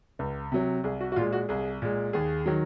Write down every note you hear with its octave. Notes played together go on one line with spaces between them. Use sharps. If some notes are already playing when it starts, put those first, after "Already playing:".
C#2
C3 F#3
C2 G#4
F#4
F#4
A#2 G#3 F4
F#4
C2 G#4
A#2 G#3
D#2 G#4
D#3 F#3